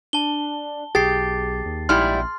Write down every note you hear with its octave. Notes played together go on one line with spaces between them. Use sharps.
D4 A5 G7
B1 G4 G#4 A6 C7
D#2
A#1 G#2 G3 E4 C6 F6